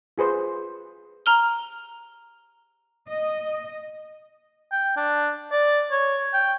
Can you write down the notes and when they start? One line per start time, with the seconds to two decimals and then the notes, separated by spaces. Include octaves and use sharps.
0.18 F4 G#4 B4 C5
1.26 A#5 F6 G7
3.08 D#5
4.72 G5
4.97 D4
5.52 D5
5.91 C#5
6.34 G5